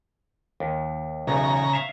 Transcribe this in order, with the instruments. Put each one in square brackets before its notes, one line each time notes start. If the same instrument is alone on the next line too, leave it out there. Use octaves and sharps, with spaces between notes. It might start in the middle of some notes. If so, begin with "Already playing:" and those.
[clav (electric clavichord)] D#2
[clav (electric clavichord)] B1 E2 [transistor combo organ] C#3 A#5
[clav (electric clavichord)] E5 F5